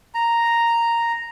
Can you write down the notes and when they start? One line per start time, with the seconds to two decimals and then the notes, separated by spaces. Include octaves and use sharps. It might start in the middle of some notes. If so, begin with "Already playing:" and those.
0.15 A#5